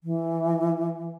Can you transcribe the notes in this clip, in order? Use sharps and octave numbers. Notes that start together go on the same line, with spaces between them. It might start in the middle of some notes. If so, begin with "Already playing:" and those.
E3